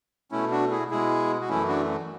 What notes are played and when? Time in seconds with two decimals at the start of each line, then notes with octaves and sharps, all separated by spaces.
0.31 B2 A3 C#4 E4
0.51 D4 F#4
0.70 E4 G#4
0.91 B2 G#3 E4 G#4
1.41 F#4
1.48 F#2 E3 A3 C#4 E4
1.68 D4 F#4